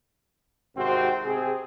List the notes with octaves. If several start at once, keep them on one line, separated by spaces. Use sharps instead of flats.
G#1 C3 C4 F#4
C3 C4 G#4